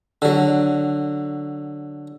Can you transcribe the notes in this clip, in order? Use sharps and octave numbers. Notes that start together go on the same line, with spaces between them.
D3 F#3